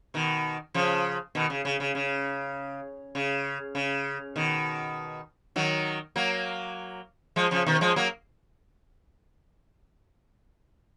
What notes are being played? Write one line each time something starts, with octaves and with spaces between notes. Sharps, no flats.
B2 D#3
C#3 F3
B2 D#3
C#3
C#3
C#3
C#3
C#3
C#3
B2 D#3
D#3 F#3
F#3 A#3
F3 G#3
C#3 F3
B2 D#3
F3 G#3
F#3 A#3